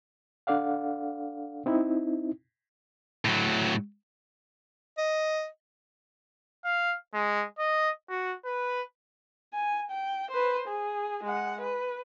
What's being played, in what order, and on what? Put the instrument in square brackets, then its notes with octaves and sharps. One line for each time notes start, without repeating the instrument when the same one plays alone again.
[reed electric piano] D4 A4 D5 F5 F#5
C4 D#4 E4
[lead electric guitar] A2 F#3
[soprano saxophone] D#5
[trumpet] F5
G#3
D#5
F#4
B4
[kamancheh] G#5
G5
B4 C5
G#4
G#3 F#5
B4